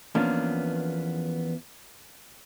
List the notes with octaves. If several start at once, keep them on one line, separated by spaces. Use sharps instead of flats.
E2 F3 A#3 B3 C#4 D4